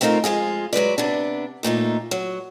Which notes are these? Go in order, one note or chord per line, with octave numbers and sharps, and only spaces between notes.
A3 B3 C4 D#4 F4 A#4
F2 G#3 F4 G#4
F#3 G#3 B4 D5
C3 B3 D4
D#2 A#2 A3 D#4
F#3